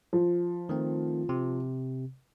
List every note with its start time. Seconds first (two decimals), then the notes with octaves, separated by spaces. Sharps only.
0.13 F3
0.69 D#3 A3 C4
1.29 C3